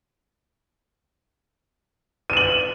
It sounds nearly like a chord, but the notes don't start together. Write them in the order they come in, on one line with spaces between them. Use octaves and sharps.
D#7 E7 F#7